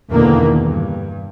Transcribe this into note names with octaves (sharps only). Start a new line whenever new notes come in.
E2 B2 D3 D#3 A#3
G2